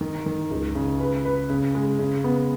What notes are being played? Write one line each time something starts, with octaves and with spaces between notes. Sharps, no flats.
D#3
D#3
C#2
C#3
B4
B4
C#3
G#3
C#3
B3